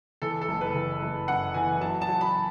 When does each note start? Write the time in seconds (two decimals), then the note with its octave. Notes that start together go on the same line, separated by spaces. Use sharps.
0.22 E3 A4
0.41 A4
0.48 F#1
0.61 B4
0.75 E3
1.02 F#1
1.28 F#2 F#5
1.54 E3 G#5
1.81 F#3 A5
2.02 A5
2.08 F#3
2.21 B5